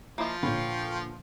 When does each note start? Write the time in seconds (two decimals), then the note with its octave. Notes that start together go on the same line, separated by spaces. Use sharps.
0.18 F3 A#3 E4 C5 D#5
0.43 A#2 D3 B4 C#5 F5 G5 C#6